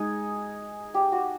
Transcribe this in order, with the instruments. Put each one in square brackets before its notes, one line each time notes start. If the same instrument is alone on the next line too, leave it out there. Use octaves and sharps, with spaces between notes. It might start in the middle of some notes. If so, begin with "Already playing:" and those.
Already playing: [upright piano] G#3 D#4 [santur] G#4
[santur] G4
F#4